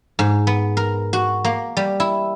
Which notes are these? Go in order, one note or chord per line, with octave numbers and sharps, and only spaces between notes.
G#2
B3
A#4
F#4
A#3
G3
E4